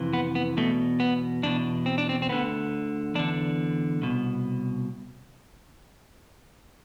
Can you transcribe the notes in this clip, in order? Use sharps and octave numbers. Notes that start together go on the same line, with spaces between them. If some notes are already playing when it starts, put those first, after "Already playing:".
Already playing: F2 C3 E3
B3
B3
E2 B2 A3
B3
E2 B2 D4
C4
D4
C4
C4
D2 D3 B3
E2 D3 D4
C2 B2